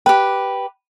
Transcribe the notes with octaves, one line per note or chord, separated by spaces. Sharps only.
G4 B4 G5